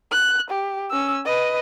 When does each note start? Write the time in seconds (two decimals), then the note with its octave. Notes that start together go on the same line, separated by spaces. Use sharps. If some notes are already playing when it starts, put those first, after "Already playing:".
0.11 F#6
0.50 G4
0.91 C#4 E6
1.25 B4 D#5